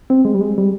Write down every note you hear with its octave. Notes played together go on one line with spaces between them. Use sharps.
C4
G#3
G3
G#3
G3